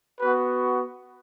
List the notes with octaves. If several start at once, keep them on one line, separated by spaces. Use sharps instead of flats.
B3 F#4 B4